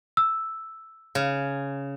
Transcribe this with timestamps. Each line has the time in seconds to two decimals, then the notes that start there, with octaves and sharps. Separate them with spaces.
0.17 E6
1.15 C#3